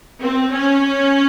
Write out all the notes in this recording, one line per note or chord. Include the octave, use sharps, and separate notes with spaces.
C4
C#4